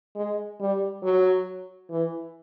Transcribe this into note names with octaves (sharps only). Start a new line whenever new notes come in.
G#3
G3
F#3
E3